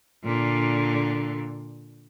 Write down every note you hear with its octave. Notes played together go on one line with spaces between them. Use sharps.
A#2 D3